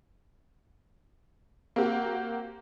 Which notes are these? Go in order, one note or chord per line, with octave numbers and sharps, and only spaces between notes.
A#3 C4 F#4 G4